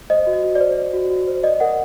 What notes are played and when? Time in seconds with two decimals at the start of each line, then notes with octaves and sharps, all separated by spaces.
0.10 C5 D#5
0.27 F#4
0.33 D#5
0.44 F#4
0.55 D5
0.61 C5
0.77 C5
0.93 F#4
1.10 F#4
1.27 C5
1.43 D5 D#5
1.60 A#4 F#5